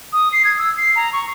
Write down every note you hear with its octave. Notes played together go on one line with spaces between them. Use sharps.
D#6
C7
G#6
E6
C7
A#5
C#6